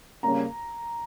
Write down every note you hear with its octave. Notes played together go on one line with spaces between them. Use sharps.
C#3 G3 A#3 C#4 A#5